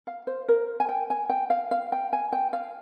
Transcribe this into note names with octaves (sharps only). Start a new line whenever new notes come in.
F5
C5
A#4
G#5
G5
G#5
G5
F5
F5
G5
G#5
G5
F5